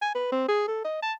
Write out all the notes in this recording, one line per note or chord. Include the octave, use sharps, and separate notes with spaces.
G#5
B4
C4
G#4
A4
D#5
A5